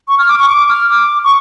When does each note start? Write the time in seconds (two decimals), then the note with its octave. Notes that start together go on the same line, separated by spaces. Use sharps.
0.08 C#6
0.18 F6
0.28 D6
0.39 C#6
0.49 D6
0.69 F6
0.90 D6
1.24 C#6